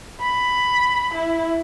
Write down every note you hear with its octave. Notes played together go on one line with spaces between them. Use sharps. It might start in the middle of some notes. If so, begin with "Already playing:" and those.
B5
E4